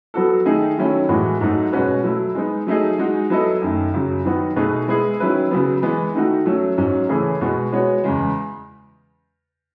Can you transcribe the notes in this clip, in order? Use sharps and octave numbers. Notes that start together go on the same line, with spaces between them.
F#3 B3 F#4 A4
D#3 A3 D#4 G#4
D#3 F#3 A3 C#4 E4
A2 E3 G#3 B3 F#4
G#2 F#3 A3 D#4 F#4
B2 G#3 C#4 F#4 B4
F#3 A3 E4
G#3 B3 D#4
F#3 A3 D#4 G#4 D#5
G#3 D#4 F#4
F#3 B3 E4 A4 D#5
F#2 D#3 A3
F#2 C#3 F#3
D#3 F#3 B3 F#4
B2 A3 D#4 G#4 B4
G#3 B3 E4 G#4
D#3 F#3 C#4 E4 B4
C#3 F#3 B3
E3 G#3 B3
D#3 A3 D#4 F#4
F#3 A3 C#4
G#2 F#3 C#4
C#3 E3 A3 C#4 G#4
B2 G#3 B3 F#4
G#3 B3 F#4 C#5
E2 C#3 G#3